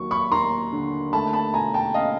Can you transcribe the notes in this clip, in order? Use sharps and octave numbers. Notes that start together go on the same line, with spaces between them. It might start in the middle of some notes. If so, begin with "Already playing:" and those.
Already playing: D#2 F#3 C#6
B5 C#6
D#2 A#5 C6
D3
A3 A5 B5
A5 B5
B2 G#5 A#5
G5 A5
C#4 D#5 F5